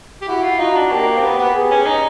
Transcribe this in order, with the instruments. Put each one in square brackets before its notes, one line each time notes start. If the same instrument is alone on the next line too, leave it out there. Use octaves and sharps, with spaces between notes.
[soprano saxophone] G4
[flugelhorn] E4 [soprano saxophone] F#4
[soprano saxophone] F4
[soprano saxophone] D#4 [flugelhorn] F#4
[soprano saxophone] D4
[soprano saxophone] A#3 [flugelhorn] G4
[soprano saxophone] C4
B3
B3
[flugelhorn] G#4
[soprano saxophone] C#4
D#4